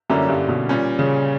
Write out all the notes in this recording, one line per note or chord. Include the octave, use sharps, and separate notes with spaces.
F#2 D3 G3 A#3 C#4 E4
G2
B2
A#2 G3 C#4
C#3